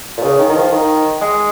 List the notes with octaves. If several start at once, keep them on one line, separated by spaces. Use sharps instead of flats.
A#2
C#3
D#3
D#3
F3
D#3
G#3